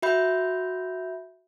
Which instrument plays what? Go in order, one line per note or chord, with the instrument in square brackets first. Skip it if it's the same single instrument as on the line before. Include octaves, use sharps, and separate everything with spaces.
[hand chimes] F#4 E5 B5 G6